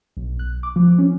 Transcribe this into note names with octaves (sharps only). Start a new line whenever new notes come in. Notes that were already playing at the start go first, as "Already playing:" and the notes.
B1
F#6
D6
F3
C#4